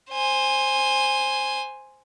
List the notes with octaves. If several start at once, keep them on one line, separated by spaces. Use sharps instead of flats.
C5 G#5